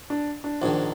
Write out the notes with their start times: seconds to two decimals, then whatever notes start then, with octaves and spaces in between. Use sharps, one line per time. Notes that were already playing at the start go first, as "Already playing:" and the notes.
0.10 D4
0.44 D4
0.62 A#1 G#2 D#3 D4